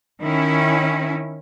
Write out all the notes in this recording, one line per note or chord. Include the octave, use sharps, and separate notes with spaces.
D#3 C#4 E4